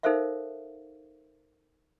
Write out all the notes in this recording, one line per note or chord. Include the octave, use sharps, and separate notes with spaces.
D#4 A4 A#4 C5 E5 F5